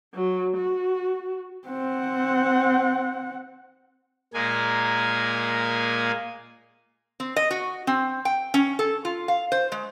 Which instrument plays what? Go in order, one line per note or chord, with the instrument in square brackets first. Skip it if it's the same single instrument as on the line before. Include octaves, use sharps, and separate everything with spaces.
[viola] F#3
F#4
[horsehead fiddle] C4 F#5
[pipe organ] A#2 G#3 A#3 G#5
[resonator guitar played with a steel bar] C4
D#5
F#4
C4
G5
C#4
A4
F4
F5
C5
G#3